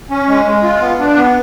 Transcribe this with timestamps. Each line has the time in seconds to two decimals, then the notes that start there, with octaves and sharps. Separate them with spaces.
0.10 C#4
0.28 G#3
0.46 G#3
0.63 F4
0.80 B3
0.99 D4
1.16 B3